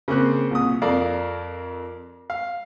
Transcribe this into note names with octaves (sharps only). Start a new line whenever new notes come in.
C#3 A#3 C4 F#6
C2 A#2 D#6
F2 A4 A#4 D5 F5
F5